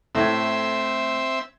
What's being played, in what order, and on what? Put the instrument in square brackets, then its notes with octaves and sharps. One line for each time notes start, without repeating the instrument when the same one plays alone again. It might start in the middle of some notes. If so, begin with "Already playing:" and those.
[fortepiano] A2 [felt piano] A3 G#6 [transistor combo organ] C4 E5